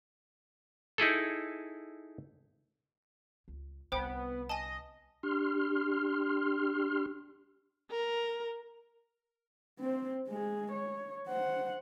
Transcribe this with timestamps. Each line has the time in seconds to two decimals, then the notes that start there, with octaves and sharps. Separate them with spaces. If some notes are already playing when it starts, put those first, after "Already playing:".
0.98 D#4 E4 G#4 A4
3.48 C#2
3.92 C2 D3 B3 C5 G5
4.49 D#5 G#5 A5
5.23 D4 G4 C6 F6
7.91 A#4
9.80 C4 C5
10.28 G#3 G#4
10.72 C#5
11.27 C5 F#5